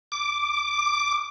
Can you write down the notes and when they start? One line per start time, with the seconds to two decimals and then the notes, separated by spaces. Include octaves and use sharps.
0.12 D6